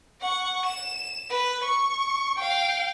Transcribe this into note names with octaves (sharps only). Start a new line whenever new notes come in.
F#5 C#6
E7
B4
C#6
F5 G5